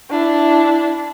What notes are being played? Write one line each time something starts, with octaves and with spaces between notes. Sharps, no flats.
D4 E4